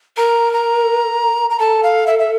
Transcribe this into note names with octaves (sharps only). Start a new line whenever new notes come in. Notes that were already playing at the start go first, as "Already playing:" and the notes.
A#4 A#5
A#5
A#5
A4 A5
F5
E5
E5